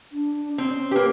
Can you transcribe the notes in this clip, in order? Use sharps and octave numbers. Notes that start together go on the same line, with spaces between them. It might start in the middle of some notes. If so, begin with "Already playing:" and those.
D4
C4 C#4
A#3 G4 B4